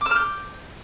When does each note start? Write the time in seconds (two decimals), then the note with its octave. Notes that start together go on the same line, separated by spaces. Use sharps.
0.01 D6
0.06 E6
0.11 F6
0.16 G6